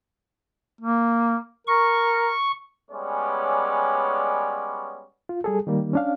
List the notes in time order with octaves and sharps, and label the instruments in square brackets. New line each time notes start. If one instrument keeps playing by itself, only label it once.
[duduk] A#3
[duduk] A#4 [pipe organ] C#6
[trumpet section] G3 G#3 B3 C#4 C#5 D5
[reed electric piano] F4
G3 G#4 A4
D#3 G3 A#3
C#4 D4 F5